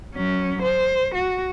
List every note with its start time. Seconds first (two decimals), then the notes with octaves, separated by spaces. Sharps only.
0.16 F#3 C#4
0.62 C5
1.15 F#4